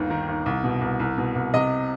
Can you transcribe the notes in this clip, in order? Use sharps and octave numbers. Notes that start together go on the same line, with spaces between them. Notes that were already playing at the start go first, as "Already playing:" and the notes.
Already playing: G1 D#2
D#3
D#2
C2
B2
C2
C2
B2
C2
C3 D#5